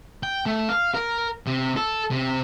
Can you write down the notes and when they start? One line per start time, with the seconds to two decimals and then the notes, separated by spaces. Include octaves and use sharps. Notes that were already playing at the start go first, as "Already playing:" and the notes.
0.23 G5
0.46 A3
0.69 F5
0.94 A#4
1.47 C3
1.77 A4
2.11 C3